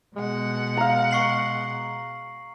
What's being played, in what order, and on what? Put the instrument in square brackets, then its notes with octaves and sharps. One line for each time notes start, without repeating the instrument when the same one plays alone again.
[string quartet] B2 F#5 [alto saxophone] G#3
[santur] F5 A#5
[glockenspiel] C#6 C7 F#7